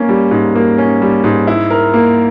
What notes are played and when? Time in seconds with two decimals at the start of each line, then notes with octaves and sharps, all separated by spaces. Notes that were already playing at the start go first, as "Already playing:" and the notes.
Already playing: A#3 C#4
0.09 G3
0.31 G#2
0.56 A#3
0.78 C#4
1.02 G3
1.24 G#2
1.47 E4
1.71 A#4
1.94 A#3